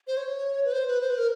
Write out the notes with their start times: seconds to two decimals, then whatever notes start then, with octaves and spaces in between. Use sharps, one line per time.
0.07 C5
0.17 C#5
0.65 B4
0.73 C5
0.88 B4
1.01 C5
1.10 B4
1.18 A#4